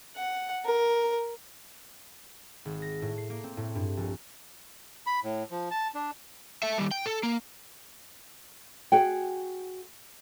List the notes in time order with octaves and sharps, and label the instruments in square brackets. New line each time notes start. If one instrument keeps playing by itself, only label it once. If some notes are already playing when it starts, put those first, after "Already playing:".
[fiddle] F#5
A#4
[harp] G#1
A#6
A2
C7
A#3
C4
A2
G2
A#1
[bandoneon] B5
A2
F3
A5
D4
[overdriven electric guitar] A4 E5
D#3 G3
G5
A4
A#3
[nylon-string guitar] F#4 G#4 G5